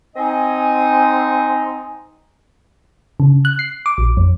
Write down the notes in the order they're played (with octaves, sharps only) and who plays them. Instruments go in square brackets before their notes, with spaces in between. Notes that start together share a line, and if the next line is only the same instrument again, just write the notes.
[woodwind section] C4 D#4 D#5 G#5
[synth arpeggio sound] C#3
F#6
C7
D6
A#1
F2